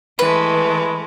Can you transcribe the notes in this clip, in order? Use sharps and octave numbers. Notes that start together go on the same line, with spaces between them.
E3 G#3 A3 B4